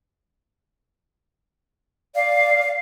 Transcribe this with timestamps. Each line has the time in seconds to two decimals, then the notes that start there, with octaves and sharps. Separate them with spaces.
2.15 D5 F5